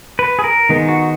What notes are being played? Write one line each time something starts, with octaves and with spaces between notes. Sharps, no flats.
B4
G#4
A#4
D#3 G#3 B3 D#4
F#4